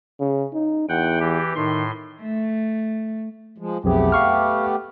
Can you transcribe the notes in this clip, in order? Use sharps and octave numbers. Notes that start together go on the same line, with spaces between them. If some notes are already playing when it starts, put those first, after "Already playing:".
C#3
D#4
E2 F#5 G5
E3 G4
A2 D#3 C6
A3
F3 G#3
B1 F2 A3 B3 G4 G#4
F5 C#6 F6